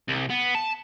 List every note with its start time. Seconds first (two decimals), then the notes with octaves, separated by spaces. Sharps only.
0.08 C2
0.30 B3
0.55 A5